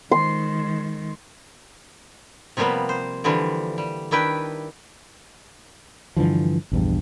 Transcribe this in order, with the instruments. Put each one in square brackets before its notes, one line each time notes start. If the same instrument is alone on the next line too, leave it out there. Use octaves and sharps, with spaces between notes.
[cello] D#3 G#3 [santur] C6
[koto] C3 F3 G3 A#3 B3
C5
D3 E3 F3 G3
G3
D#3 D4 E4 B4 G5
[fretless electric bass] G2 D3 E3 F3
A#1 E2 G2